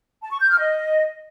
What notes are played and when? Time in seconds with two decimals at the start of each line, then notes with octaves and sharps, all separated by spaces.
0.22 A5
0.31 C#6
0.41 G6
0.50 F6
0.59 D#5